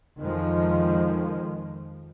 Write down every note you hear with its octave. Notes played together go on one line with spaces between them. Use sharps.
F2 D#3 F3 G#3